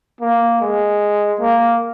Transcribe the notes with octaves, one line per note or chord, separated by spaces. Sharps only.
A#3
G#3
A#3